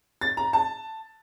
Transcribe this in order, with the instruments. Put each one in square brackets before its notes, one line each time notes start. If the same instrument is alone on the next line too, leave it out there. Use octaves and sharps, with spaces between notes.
[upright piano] A6
A#5
A5